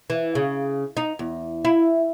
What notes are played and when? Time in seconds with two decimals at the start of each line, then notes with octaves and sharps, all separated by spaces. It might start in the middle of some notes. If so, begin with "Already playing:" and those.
0.10 E3
0.35 C#3
0.97 D#4
1.19 E2
1.65 E4